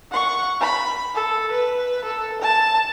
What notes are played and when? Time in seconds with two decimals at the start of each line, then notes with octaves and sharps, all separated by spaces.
0.11 F#5 C#6
0.61 B5
1.15 A4
1.51 B4
2.04 A4
2.42 A5